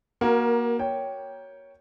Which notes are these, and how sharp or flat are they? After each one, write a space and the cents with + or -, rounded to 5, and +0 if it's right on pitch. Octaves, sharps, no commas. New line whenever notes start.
A#3 +20 F#4 +5 A#4 +0
C#5 +5 G5 +0